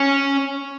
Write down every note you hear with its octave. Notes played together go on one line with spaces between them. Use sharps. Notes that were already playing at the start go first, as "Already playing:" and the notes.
Already playing: C#4